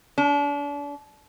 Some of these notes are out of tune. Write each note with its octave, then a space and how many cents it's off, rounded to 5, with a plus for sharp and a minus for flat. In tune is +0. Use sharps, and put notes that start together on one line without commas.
D4 -35